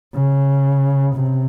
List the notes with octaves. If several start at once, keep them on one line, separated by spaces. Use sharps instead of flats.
C#3
C3